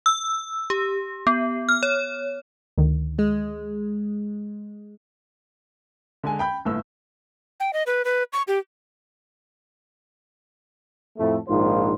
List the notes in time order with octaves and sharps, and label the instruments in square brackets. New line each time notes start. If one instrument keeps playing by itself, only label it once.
[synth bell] E6
G4
B3
F6
C#5
[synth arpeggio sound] D2 D#3
[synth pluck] G#3
[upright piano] D3 G#3 G#5
G5 B5 G6
G1 A2 E6
[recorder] G5
D#5
B4
B4
C#6
G4
[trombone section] F2 A2 A3
A#1 G#2 D#3 F4 C5